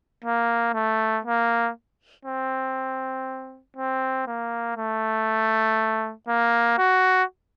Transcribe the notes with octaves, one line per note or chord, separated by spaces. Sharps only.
A#3
A3
A#3
C4
C4
A#3
A3
A#3
F#4